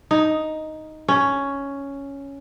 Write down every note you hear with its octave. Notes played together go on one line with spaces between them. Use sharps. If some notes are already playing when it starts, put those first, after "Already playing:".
D#4
C#4